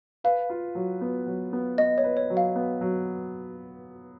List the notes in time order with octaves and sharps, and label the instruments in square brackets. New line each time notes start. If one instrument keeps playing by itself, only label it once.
[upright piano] B4 [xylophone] F5
[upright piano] F4
F#3
B3
F#3
B3
[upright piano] B3 [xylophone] D#5
[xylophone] C#5
[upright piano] B4
[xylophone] C#5
[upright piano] F#3
[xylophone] F5
[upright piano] B3
F#3